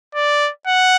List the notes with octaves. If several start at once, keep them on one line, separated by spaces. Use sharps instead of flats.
D5
F#5